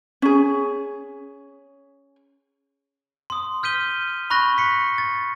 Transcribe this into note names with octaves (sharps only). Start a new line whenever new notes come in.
C#4 G#4
C6 D#6
F6 G6 B6 D#7 G7
B5 C#6 F#6 A#6 G7
B6 C#7
A6